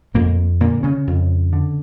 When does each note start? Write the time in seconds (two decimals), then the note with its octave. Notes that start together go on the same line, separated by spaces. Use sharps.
0.14 F2 A#2 A#3
0.61 A#2 D3 A#3
0.83 C#3 C#4
1.07 F2
1.53 D3